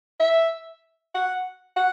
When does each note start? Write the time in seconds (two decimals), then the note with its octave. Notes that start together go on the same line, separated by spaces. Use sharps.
0.20 E5
1.15 F#5
1.76 F#5